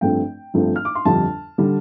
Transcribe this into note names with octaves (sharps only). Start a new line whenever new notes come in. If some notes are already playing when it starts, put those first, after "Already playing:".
G1 G2 F3 A3 C4 G5
G1 G2 F3 A3 C4
F6
D6
C6
G1 F2 D3 G3 A5
D3 G3